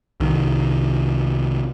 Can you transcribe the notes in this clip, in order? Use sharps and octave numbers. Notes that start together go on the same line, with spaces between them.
C2 D#3